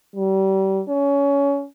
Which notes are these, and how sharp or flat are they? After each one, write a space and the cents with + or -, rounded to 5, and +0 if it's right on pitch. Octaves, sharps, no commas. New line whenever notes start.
G3 -30
C#4 +25